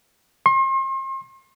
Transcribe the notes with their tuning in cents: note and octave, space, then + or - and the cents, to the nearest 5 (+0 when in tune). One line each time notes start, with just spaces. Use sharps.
C6 +40